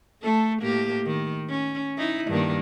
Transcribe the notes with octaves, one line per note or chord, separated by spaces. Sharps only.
A3 A4
A2 A#3 G4
D#3
C#4
D#4 E4
G2 D#3 A#3